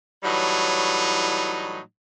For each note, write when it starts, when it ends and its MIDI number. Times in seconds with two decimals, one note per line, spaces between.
0.23 1.79 45
0.23 1.79 52
0.23 1.79 54
0.23 1.79 55
0.23 1.79 63